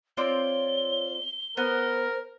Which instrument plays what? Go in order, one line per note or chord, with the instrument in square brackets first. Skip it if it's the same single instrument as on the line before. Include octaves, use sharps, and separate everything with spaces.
[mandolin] C4 F4 D5 [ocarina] C#5 [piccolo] G7
[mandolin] B3 [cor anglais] A#4 [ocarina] C5